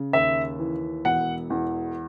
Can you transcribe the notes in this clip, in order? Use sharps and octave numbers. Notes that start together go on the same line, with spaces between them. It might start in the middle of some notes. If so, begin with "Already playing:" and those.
Already playing: C#3
D#2 E5
E3
E1 F#5
E2